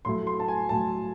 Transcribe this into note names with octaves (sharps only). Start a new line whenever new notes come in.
A2 F#3 A3 C6
C6
A5
G#5
A2 F#3 A3 A5